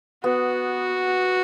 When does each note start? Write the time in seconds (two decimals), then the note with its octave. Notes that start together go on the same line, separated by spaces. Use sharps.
0.24 B3 F#4